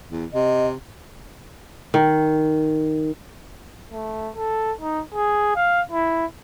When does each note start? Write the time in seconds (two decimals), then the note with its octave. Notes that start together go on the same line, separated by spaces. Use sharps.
0.10 E2
0.33 C3 D#5
1.94 D#3
3.92 A3
4.36 A4
4.81 D#4
5.15 G#4
5.56 F5
5.92 E4